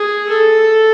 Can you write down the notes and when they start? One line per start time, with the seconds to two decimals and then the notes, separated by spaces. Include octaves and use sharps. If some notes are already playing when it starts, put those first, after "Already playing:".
Already playing: G#4
0.28 A4